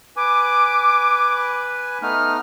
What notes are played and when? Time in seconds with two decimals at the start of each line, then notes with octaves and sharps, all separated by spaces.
0.17 B4 G#5 D6
2.02 A3 B3 D#4 F6